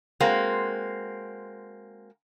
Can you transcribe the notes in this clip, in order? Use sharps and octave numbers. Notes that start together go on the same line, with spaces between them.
G#3 A#3 C4 F#4